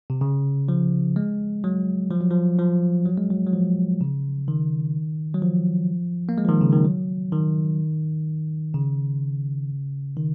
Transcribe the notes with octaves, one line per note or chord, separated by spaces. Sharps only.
C3
C#3
F3
G#3
F#3
F3
F#3
F3
F3
F#3
G#3
F#3
F#3
F3
C#3
D#3
F#3
F3
A#3
G#3
F3
D#3
C#3
D#3
F#3
D#3
C#3
D#3